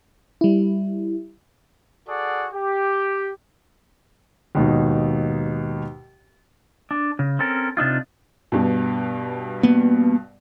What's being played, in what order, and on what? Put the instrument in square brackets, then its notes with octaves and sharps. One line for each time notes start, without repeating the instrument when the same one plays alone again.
[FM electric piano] G3 E4
[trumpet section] F#4 G#4 A4 D5 F#5
G4
[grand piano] D#2 G#2 B2 D#4
[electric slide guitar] D4
C#3
C4 C#4 A4 A#4
C3 D4 D#4 F4
[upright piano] G2 B2
[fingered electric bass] A#3 B3